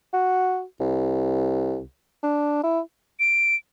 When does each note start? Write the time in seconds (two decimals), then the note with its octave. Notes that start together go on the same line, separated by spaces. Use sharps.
0.14 F#4
0.80 C2
2.23 D4
2.64 E4
3.20 D7